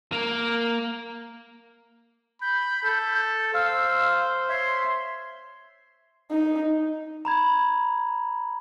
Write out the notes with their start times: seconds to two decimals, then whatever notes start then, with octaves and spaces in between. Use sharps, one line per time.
0.12 A#3
2.41 B5 G6
2.83 A4
3.54 C5 F5 E6
4.49 C#5 E5 C6
6.31 D#4
7.25 A#5 B5 G#6